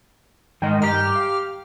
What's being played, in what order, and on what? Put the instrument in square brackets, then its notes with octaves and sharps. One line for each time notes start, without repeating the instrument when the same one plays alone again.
[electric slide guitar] G#2 G#3 D#5 [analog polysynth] D#3
[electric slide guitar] G2 A#5 [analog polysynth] G4 F6
[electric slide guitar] F5